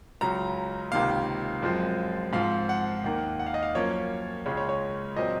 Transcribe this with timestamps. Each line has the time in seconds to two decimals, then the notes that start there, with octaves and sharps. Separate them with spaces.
0.21 C#2 C#3 F#3 A#5
0.92 C#2 C3 D#3 A#3 F5
1.62 F#2 F3 G#3 C4
2.33 G#2 F3 C4 F5
2.69 F#5
3.04 D#2 D#3 A#3
3.39 F#5
3.46 F5
3.54 D#5
3.63 F5
3.75 F#2 F3 A#3 C#4 C#5
4.46 C#2 C#3 G#3 C#5
4.57 C#5
4.69 C#5
5.17 A#2 F#3 C4 D#5